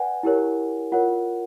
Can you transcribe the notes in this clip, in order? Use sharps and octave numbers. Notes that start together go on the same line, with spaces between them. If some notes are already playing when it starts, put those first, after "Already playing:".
Already playing: B4 D5 F#5 G#5
E4 G4 A#4 C#5
F4 A#4 C#5 F#5